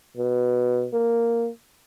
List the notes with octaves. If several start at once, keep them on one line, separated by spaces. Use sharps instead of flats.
B2
A#3